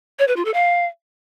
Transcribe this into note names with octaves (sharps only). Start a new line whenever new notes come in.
C#5
B4
F4
A4
F5